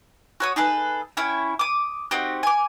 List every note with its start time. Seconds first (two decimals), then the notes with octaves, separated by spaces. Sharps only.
0.40 F#4 C#5 D#6
0.56 D#4 G#4 A4 B4
1.17 C#4 E4 G5
1.59 D6 D#6
2.11 C4 D#4 F#4 G4
2.43 G#5 D6